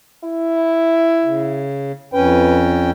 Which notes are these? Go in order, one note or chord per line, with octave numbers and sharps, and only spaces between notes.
E4
C#3
F2 C#4 B4 G5